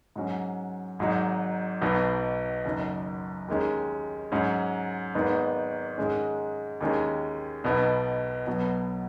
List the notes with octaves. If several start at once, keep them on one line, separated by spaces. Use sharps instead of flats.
G#2 F#3 C#4
G#1 G#2 F#3 D#4
B1 B2 B3 D#4
F#1 F#2 D#3 F#3
D#2 D#3 G#3 C#4
G#2 F#3 C#4
G#1 G#2 D#3 B3 D#4
G#2 D#3 G#3 C#4
D#2 D#3 G#3 C#4
B1 B2 B3 D#4
B1 B2 F#3 B3